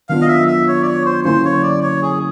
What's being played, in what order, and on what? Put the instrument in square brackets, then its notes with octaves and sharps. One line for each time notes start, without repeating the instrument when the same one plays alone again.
[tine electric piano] D#3 F#3 B3 D4 F4 [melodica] F5
[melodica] D#5
E5
E5
C#5
D5
C#5
C5
[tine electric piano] D3 F#3 A#3 C#4 E4 [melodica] C5
[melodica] C#5
D5
C#5
G#4